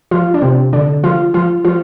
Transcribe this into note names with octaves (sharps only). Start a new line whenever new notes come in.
F3 F4
D4
C3 C4
D3 D4
F3 F4
F3 F4
F3 F4